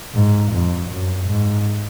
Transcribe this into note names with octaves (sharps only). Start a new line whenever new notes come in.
G#2
F2
F#2
G#2